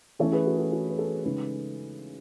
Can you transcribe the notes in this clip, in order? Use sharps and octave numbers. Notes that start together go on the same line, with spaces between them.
E3 A3 C#4 A4 C#5
G#4 B4
F#4 A4
F#4 A4
F#4 A4
B4
F#4 A4
C#3 G#3 D#4 G#4 B4